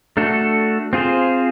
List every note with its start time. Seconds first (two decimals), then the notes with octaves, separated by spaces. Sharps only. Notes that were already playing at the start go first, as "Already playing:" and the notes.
0.17 A3 D4 F#4 A4
0.93 C4 F4 G#4 C5